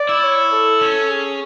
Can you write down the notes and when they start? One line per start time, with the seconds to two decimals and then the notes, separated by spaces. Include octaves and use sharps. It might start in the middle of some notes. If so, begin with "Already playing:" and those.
Already playing: D5
0.09 E4
0.23 C#5
0.52 A4
0.81 C#4
1.10 G#4